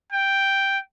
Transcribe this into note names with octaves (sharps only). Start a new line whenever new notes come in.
G5